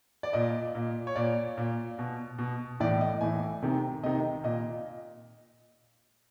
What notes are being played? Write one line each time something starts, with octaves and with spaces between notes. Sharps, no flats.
D5
A#2 D#5
A#2
C#5
A#2 D5
A#2
B2
B2
A2 E3 D5
D#5
A2 E3 G#5
C3 D#3
C3 D#3 D#5
A#2 D#5